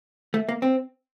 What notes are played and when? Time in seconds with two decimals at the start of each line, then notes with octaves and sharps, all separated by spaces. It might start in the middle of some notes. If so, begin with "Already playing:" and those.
0.34 A3
0.49 A#3
0.62 C4